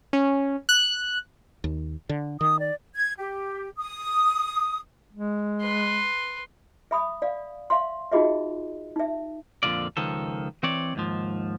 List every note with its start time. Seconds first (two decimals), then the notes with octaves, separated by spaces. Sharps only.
0.13 C#4
0.69 F#6
1.64 D#2
2.09 D3
2.41 D#3 D#6
2.60 D5
2.95 G#6
3.18 G4
3.77 D#6
5.13 G#3
5.61 B4 C6
6.91 E5 B5 D#6
7.22 D5 F5
7.70 E5 F5 C6
8.12 D#4 F4 F#4 G#4 D#5 E5
8.96 D#4 E5
9.63 F2 A#2 D3 F#3 F4 D5
9.97 C#2 D#3 F3 A4
10.63 E3 C4 C#5 D5
10.95 D#2 G#2 F3